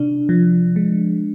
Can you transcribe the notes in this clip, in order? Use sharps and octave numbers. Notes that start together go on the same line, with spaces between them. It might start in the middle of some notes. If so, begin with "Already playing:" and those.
Already playing: C3 D4
F3
G#3